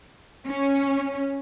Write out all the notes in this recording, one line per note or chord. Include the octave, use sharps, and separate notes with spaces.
C#4